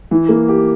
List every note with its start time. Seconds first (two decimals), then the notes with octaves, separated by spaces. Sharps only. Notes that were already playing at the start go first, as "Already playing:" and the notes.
0.11 E3
0.29 A#3
0.48 G4